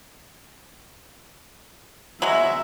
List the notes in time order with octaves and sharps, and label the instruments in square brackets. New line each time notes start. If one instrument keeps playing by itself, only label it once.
[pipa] F#3 G#3 [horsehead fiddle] E5